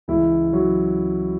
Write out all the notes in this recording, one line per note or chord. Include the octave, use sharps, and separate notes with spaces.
C#2 C#3 E3 E4
F#3 F#4